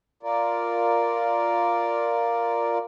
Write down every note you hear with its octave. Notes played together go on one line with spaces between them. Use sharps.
F4 A#4 D5